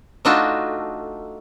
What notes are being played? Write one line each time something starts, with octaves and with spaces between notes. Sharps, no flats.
A3 D4 D#4 F4 F#4 A4